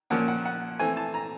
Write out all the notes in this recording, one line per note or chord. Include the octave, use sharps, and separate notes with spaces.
A#2 F3 A#3 C#4 F#5
F#5
F#5
E3 A3 C4 G#5
A5
A#5